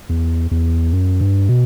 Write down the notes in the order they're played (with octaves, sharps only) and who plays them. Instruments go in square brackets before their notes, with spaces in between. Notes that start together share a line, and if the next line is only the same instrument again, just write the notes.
[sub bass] E2
E2
F#2
G2
B2